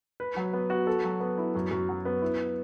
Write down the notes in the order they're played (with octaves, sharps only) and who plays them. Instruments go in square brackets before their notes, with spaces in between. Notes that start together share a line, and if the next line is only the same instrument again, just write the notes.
[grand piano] B4
F#3
B3
F#4
A4
F#3
B3
E4
F#2
F#2
F#3
B3
E4